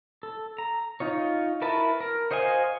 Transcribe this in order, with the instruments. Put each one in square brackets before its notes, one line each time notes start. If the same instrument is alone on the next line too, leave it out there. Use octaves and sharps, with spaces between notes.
[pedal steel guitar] A4
A#5
D#4 F4 C#5
E4 F#4 A#4 B4 A5
A#4
F#4 C5 D#5 F5 G#5